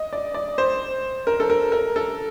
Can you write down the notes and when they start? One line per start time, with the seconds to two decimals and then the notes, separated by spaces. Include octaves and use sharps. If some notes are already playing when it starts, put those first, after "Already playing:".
Already playing: D#5
0.13 D5
0.34 D5
0.58 C5
1.27 A#4
1.40 A4
1.50 A#4
1.72 A#4
1.96 A4